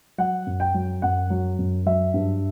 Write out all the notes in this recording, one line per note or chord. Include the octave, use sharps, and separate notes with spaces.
F#3 F#5
F#2
G5
F#3
F#2 F#5
F#3
F#2
F#3 E5
G2